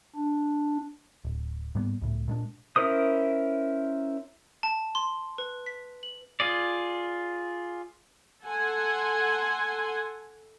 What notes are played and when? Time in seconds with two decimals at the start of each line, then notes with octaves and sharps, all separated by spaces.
0.16 D4
1.25 D1
1.75 G#2 G3 A#3 B3
2.02 C#2 A2
2.28 A#2 G#3 D4
2.76 C#4 E4 A#4 C5 D#6
4.63 A5
4.95 C6
5.38 B4
5.66 B6
6.03 F#7
6.40 F4 G#4 D5
8.44 A4 F#5 G#5 C6